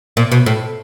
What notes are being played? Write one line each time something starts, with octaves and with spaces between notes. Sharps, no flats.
A#2
B2
A2